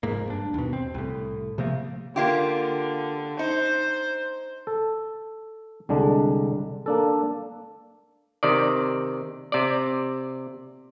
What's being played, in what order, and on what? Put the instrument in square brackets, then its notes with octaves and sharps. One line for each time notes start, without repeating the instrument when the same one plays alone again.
[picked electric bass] F1 G#2 A#3
G2 D4
D#2 B2
C4
C2 A2
C3 F3 A3 A#3
[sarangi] D3 [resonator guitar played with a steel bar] A#3 F4 G4
[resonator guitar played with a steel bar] D#4 [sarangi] C5
[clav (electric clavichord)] A4
C2 D3 G#3 D4
A#3 D4 A4
C3 D#3 D5
C3 D5